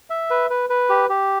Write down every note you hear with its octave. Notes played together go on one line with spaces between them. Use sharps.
E5
B4
B4
B4
G4
G4